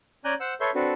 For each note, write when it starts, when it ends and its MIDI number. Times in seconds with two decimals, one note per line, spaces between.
0.25 0.34 61
0.25 0.34 74
0.25 0.34 80
0.25 0.34 82
0.25 0.34 90
0.25 0.34 91
0.40 0.54 72
0.40 0.54 78
0.40 0.54 88
0.60 0.70 69
0.60 0.70 71
0.60 0.70 73
0.60 0.70 76
0.60 0.70 84
0.60 0.70 91
0.75 0.94 60
0.75 0.94 62
0.75 0.94 66
0.75 0.94 69
0.75 0.94 71